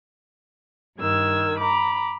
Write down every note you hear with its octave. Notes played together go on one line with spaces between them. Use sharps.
G2 D#3 E6 G#6
A#5 B5 D6